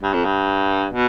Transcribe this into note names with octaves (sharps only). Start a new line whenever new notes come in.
G2
F2
G2
B2